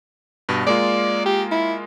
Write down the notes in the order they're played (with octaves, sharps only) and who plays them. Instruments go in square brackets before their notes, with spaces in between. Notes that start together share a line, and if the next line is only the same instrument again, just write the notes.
[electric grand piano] G2 B2
[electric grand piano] G#3 A#3 F4 [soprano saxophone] D5
[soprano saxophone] G4
E4